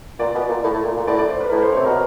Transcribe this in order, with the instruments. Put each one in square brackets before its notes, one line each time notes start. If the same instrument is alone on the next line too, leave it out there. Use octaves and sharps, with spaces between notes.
[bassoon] A#2 [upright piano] D5
[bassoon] B2
A#2
A2
A2
A#2
A#2
[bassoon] A2 [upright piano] D5
[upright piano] D5
C5
B4
A#4
[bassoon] A2 [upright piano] B4
[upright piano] C5
[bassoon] C3 [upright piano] C#5
[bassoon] B2 [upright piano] A#4